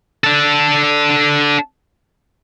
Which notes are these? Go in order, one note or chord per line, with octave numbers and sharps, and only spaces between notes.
D4 A4